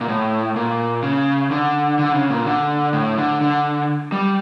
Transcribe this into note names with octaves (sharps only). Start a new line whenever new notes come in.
A#2
A2
A#2
C#3
D3
D3
C#3
A#2
D3
A2
D3
D3
G3